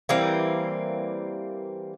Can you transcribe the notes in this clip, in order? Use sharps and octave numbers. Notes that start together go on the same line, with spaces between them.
E3 G3 A#3 C4